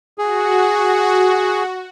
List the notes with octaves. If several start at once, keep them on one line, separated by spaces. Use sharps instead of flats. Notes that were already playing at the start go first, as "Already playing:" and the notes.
F#4 G#4